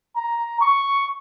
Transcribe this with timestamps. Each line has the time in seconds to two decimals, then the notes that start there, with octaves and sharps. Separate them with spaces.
0.16 A#5
0.61 C#6